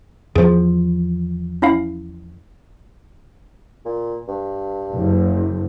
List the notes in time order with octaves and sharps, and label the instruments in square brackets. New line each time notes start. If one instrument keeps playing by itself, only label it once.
[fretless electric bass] E2 F3 [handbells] G#4 C5
[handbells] C#4 E4 F5
[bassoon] A#2
G2
[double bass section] F#1